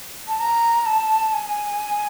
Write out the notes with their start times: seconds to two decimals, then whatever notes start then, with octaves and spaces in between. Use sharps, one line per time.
0.28 A5
0.40 A#5
0.86 A5
1.33 G#5